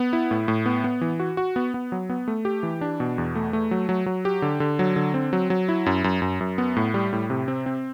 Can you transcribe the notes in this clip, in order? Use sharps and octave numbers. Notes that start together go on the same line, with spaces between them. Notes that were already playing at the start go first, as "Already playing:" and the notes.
Already playing: B3
E4
A2
A2
B3
B3
E3
F#4
F#4
B3
B3
F#3
B3
A3
G4
E3
D4
B2
E2
A3
A3
F#3
F#3
F#3
G4
D3
D3
F#3
D3
C4
F#3
F#3
E4
F#2
F#2
F#2
F#2
B3
A2
G3
A2
C3
C4
C4